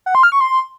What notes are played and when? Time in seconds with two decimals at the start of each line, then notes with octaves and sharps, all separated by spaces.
0.06 F#5
0.15 C6
0.23 F6
0.32 C#6
0.41 C6